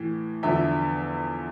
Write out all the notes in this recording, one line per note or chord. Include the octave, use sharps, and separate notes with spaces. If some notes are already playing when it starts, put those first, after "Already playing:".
Already playing: A2 E3
E2 D3 F3 E5